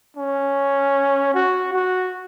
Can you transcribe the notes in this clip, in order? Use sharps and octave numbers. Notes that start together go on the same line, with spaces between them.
C#4
F#4
F#4